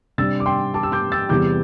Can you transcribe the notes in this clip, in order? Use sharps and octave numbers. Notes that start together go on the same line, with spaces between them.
C3 G3 D4 E6 A6
D6
G5 C6
A5 D6
E6
D6 G6
E6 A6
E2 C3 E3 G3 D6 G6